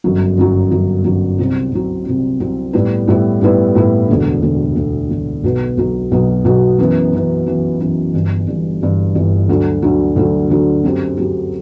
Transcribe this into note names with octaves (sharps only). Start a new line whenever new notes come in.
G1 F#2 F#3
G1 F#2 F#3
G1 F#2 F#3
G1 F#2 F#3
C2 C3 F#3 C4
C2 C3 F#3 C4
C2 C3 F#3 C4
C2 C3 F#3 C4
A2 G3 B3 E4 B4
A2 G3 B3 E4 B4
A2 G3 B3 E4 B4
A2 G3 B3 E4 B4
E1 D2 D3
E1 D2 D3
E1 D2 D3
E1 D2 D3
B1 B2 F#3 B3
B1 B2 F#3 B3
B1 B2 F#3 B3
B1 B2 F#3 B3
F#2 E3 B3
F#2 E3 B3
F#2 E3 B3
F#2 E3 B3
G1 G2 E3
G1 G2 E3
G1 G2 E3
G1 G2 E3
D2 D3 F#3
D2 D3 F#3
D2 D3 F#3
D2 D3 F#3
F#2 F#3 C4 G4
F#2 F#3 C4 G4